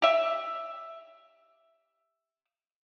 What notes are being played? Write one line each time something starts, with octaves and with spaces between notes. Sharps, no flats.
G4 E5